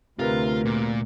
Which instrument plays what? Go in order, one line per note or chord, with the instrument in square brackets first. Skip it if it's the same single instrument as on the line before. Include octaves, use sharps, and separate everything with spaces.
[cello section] D2 [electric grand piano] C3 A#4 B4 [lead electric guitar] F4
[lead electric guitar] A#2